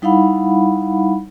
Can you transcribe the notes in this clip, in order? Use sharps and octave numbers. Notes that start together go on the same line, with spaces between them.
G3 D#4 E4 F5 F#5 B5